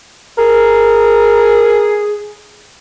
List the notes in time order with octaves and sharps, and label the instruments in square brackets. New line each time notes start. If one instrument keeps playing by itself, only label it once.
[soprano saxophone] G#4 [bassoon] A#4